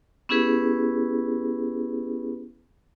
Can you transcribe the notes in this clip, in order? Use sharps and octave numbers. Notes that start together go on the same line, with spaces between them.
B3 C#4 E4 G4 G#4 B4